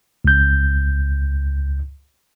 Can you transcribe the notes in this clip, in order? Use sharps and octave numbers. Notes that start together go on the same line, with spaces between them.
C#2 G6